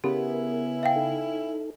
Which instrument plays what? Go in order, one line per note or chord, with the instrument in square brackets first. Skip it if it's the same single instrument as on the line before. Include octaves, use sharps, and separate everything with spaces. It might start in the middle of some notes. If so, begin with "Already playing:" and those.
[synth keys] C#3 B3 [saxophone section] C#4 E4 [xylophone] G4 [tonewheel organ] A#4
[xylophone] E5 F5 G5
[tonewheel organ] D#4 A4